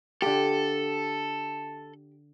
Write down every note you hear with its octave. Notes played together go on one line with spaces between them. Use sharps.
D3 F4 G4 A4